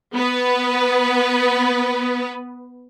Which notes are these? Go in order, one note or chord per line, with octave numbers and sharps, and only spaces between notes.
B3 B4